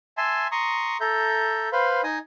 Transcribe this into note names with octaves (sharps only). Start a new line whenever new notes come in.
E5 G#5 A5 C6
A#5 C6 C#6 D#6
A4 E5 A#5 G6
B4 C5 F5 B5 C6
D#4 D#5 G#5 D#6